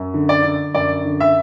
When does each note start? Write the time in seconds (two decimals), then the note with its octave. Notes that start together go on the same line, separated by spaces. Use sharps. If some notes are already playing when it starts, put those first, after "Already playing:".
Already playing: F#2
0.14 D3
0.29 D5
0.44 D3
0.75 F#2 D5
1.05 D3
1.20 E5